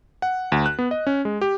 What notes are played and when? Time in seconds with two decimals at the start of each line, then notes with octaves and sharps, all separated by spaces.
0.22 F#5
0.52 D2
0.66 F#6
0.79 B3
0.91 D#5
1.07 C#4
1.25 G#3
1.41 G4